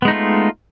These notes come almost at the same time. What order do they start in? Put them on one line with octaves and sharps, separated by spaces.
B3 G#3 D#4 A3 F4